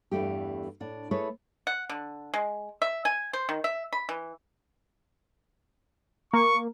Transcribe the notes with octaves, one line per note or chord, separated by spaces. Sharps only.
E2 G2 E3 A3 G4
A2 D4
A3 E4 G#4 B4 C#5
F#5
D3
G#3
E5
G#5
C5
D#3
E5
B5
E3
A#3 C#6